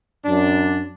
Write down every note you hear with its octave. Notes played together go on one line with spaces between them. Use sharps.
F#2 D4